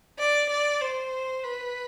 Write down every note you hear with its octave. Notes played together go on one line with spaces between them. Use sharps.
D5
D5
C5
B4